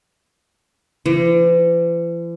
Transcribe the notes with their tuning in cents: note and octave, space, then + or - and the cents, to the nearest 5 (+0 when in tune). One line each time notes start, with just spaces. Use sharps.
E3 +45